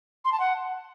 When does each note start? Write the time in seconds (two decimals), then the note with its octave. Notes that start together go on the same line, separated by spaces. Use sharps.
0.25 C6
0.32 A5
0.40 F#5